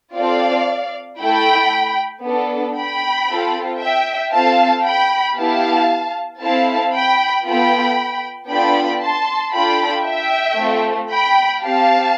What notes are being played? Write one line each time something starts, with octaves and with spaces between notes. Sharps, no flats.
C4 F4 A4 D5 F5
A3 E4 A4 G5 B5
B3 D4 A4
G5 B5
C4 F4 A4
E5 G5
C4 F4 A4 F5 A5
G5 B5
B3 E4 G4 F5 A5
C4 E4 A4 F5 A5
G5 B5
B3 F4 A4 G5 B5
B3 D4 F4 A4 G5 B5
A5 C6
D4 F4 A4 G5 B5
E5 G5
A3 C4 F4
G5 B5
C4 G4 F5 A5